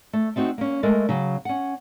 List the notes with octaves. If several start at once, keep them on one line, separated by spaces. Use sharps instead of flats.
A3
A3 C4 D#4 F#4
A#3 C#4
G#3 A3 A4 A#4
C#3 F#3
C#4 F#5